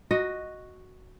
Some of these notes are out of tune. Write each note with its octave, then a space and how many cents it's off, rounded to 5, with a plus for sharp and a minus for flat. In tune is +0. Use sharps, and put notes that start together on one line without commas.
F#4 +0 D#5 +0